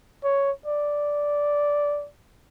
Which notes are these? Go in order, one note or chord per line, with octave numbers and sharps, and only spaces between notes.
C#5
D5